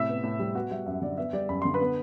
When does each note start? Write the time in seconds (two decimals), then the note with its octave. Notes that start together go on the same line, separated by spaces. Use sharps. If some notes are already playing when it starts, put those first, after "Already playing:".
Already playing: A2 C3 E5 E6
0.09 B3
0.24 A2
0.39 G3
0.55 B3 F#4 F#5
0.71 G3 E5
0.86 F#2 E5
1.02 D3 D5
1.18 B3 E5
1.33 G3 D5
1.49 F#2 B5
1.62 D3 C6
1.74 B4 B5
1.81 B3